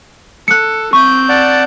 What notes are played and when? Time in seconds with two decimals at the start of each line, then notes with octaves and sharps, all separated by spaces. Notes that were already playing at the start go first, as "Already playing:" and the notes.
0.48 A4 F#6 C#7
0.93 C4 C#6 G6
1.29 D5 F#5 A5